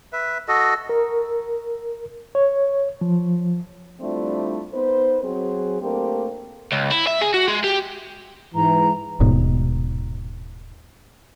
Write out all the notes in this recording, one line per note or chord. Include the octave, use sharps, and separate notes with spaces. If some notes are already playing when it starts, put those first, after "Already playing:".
B4 E5
F#4 A4 D#5
A#4
C#5
F3
G3 A3 C4 D4 E4 F4
B3 D#4 B4 C5
F#3 C4 G#4
A3 A#3 C4 D4 G4 A#4
C#2
E4
E5
G#4
F#4
G#3
G4
G#2 E3 A#5
D#1 G#2 B2